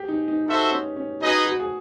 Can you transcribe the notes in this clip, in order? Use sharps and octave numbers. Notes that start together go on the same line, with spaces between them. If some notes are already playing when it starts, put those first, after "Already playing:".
Already playing: G4 G#4
D#4
D#4
D#4 F#4 A4 C5 E5
C#4
C#4
D#4 F#4 G#4 B4 D#5
F#4
G#4